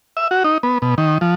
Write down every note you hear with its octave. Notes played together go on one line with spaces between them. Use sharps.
E5
F#4
D#4
B3
B2
D#3
F3